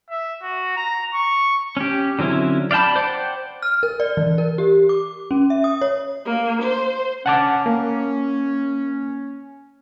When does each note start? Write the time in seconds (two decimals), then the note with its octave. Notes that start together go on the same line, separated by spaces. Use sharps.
0.10 E5
0.43 F#4
0.77 A#5
1.14 C#6
1.77 C#4 G4
2.19 D3 F#3 C4 C#4 E4
2.71 D5 F5 G5 A5 B5
2.96 C5 D5 F#5 G5
3.62 F6
3.83 A#4
4.00 D5
4.17 E3
4.38 A#4
4.58 G4
4.89 D6
5.31 C#4
5.50 E5
5.64 D#6
5.82 C#5
6.26 A#3
6.62 C5
7.26 C#4 F#5 A5 D6
7.66 A#3